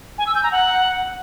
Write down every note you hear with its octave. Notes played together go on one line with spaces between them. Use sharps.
G#5
E6
G6
A#5
F#5